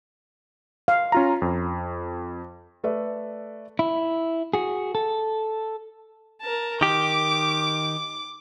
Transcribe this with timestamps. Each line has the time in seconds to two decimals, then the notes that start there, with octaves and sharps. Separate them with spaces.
0.88 F5
1.12 C#4 F4 A#5
1.42 F2
2.83 A3 A4 B4 D5 E5
3.79 E4
4.54 F#4 G#4
4.95 A4
6.42 A#4 A5
6.81 D#3 G4 D6